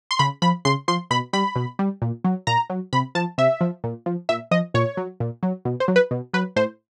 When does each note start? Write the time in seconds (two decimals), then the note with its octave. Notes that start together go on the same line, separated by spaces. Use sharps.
0.11 C6
0.19 C#3 B5
0.42 F3 B5
0.65 C#3 C6
0.88 F3 C6
1.11 B2 B5
1.33 G3 B5
1.56 B2
1.79 G3
2.02 A#2
2.24 F#3
2.47 A#2 A#5
2.70 F#3
2.93 C3 B5
3.15 F3 A5
3.38 C3 E5
3.61 F3
3.84 A#2
4.06 F3
4.29 A#2 E5
4.51 F3 D#5
4.74 A#2 C#5
4.97 F#3
5.20 A#2
5.43 F#3
5.65 B2
5.80 C5
5.88 F#3
5.96 B4
6.11 B2
6.33 F#3 B4
6.56 A2 C5